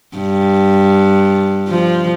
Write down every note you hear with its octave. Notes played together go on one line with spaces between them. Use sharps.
G2
F3